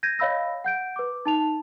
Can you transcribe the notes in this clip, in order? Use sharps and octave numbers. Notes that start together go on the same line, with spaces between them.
G6 G#6 A#6 D#7
C#5 D#5 F5 B5 E6 A#6
F#5 G6 D7
B4 D6
D#4 A5 F7